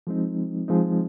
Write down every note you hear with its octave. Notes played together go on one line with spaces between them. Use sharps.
F3 G#3 C4 D#4
F3 G#3 C4 D#4